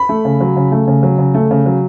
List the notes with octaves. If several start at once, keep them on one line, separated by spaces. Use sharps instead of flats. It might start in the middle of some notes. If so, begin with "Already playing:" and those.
Already playing: B5
A3
C#3
F#3
C#3
A3
C#3
F#3
C#3
A3
C#3
F#3